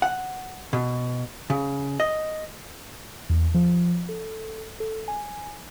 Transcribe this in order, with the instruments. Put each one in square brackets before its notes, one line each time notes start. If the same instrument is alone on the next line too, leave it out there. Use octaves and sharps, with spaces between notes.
[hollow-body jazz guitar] F#5
B2
C#3
D#5
[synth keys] E2
F3
A4
A4
G#5